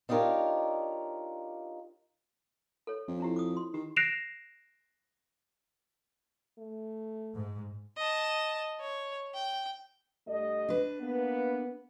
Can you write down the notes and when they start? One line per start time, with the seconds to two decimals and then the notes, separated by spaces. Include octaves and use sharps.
0.09 D4 D#4 F4 G4 A#4 C#5
2.87 A4 C#5
3.08 F2
3.20 D4 E4 G4
3.36 D6 D#6
3.57 C6
3.74 D#3 G4
3.96 F#6 A#6 C7 D7 E7 F7
6.59 A3
7.35 G#2
7.97 D#5 A5
8.80 C#5
9.35 G5
10.28 G2 A3 D#5
10.68 D4 B4
11.00 A#3 B3